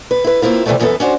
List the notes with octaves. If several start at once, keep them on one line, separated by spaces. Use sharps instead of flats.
B4
E4 B4
A#3 C4 E4 F4
C3 E3 F#3 G3 A3 B3
F#2 E3 B3 F4 A4 B4
C#4 D4 F#4 C5